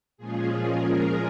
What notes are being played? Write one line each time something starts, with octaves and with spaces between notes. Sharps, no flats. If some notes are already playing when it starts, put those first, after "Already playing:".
A#2 F3 G#3 C#4 F4 G#4
A#4